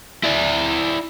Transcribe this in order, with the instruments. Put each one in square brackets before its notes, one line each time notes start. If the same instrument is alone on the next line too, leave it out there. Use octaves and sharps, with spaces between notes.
[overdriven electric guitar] E4 D5